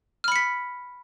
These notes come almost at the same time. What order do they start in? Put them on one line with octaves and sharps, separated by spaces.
F6 B5 C#7 B6